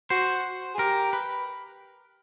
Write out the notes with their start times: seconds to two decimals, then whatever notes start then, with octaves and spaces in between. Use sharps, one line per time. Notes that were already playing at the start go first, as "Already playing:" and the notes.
0.10 F#4 C5
0.74 G#4
0.79 G4 A#4
1.13 B4